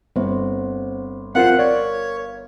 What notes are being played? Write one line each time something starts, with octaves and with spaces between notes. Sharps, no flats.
G1 C4 C5
C4 F4 A#4 C5 F5 F#5
C#5 D5